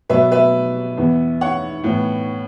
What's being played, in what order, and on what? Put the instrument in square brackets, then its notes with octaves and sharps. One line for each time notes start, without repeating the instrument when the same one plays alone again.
[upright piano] B2 F#3 B3 B4 E5
B4 E5
E2 E3 B3
C#5 F#5
A2 E3 B3